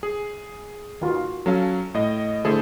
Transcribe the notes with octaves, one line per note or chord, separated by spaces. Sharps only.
G#4
D#3 F4 F#4
F#3 C#4 A4 F5
A2 D#5
D3 A3 E4 G#4 A4 C5